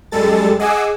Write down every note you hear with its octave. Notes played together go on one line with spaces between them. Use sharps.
F#2 G3 G#3 A4 A6
G#4 D#5 F#5 G#5 D6 E6